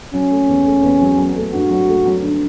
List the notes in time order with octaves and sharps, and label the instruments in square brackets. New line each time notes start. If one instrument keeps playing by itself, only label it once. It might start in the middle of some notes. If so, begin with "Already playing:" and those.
[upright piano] F#3 [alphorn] C#4
[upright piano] A3
E2
A3
E2
F#3
F#3
A3
[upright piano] G2 [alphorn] F#4
[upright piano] F#3
A3
F#3
D3